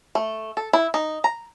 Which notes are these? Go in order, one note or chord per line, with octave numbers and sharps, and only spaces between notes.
A3
A4
E4
D#4
A#5